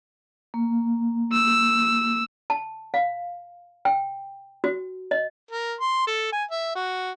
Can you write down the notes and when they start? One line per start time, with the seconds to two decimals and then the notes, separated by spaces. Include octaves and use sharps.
0.54 A#3
1.33 E6
2.50 A5
2.94 F5
3.85 G5
4.64 F#4
5.11 D#5
5.51 A#4
5.80 C6
6.07 A4
6.33 G#5
6.51 E5
6.75 F#4